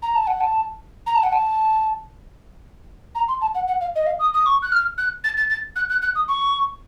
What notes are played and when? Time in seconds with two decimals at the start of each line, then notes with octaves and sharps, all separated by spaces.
0.02 A#5
0.15 A5
0.27 F#5
0.40 A5
1.06 A#5
1.15 A5
1.23 F#5
1.32 A5
3.15 A#5
3.28 C6
3.41 A5
3.55 F#5
3.67 F#5
3.81 F5
3.96 D#5
4.06 F5
4.19 D#6
4.34 D#6
4.46 C#6
4.62 F#6
4.72 F6
4.98 F#6
5.24 A6
5.37 A6
5.50 A6
5.76 F#6
5.89 F#6
6.02 F#6
6.15 D#6
6.28 C#6